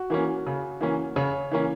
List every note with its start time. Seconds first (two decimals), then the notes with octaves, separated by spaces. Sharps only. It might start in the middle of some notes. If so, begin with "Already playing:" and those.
Already playing: F#4
0.10 E3 A#3 C#4
0.46 C#3
0.81 E3 A#3 C#4
1.16 C#3 C#5
1.52 E3 A#3 C#4